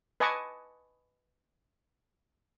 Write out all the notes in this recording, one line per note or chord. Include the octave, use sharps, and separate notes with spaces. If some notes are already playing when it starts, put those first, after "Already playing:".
B4 D#5 G#5 A5 C#6 D6